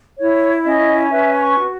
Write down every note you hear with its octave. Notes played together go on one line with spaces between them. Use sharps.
E4 C#5
C#4 D#5
B4 E5
C#6
F#4